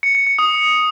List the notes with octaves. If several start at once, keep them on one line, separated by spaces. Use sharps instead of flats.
C#7
C#7
C#7
D#6